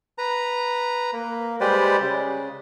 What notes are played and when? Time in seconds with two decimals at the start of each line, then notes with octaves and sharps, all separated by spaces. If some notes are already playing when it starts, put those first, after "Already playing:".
0.18 B4 A#5
1.13 A#3
1.61 G3 G#3 G4 B4 C5 D5
2.01 C#3